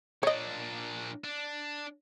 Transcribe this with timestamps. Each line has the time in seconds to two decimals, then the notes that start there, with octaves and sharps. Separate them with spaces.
0.23 A#2 D4 C#5 D#5
1.24 D4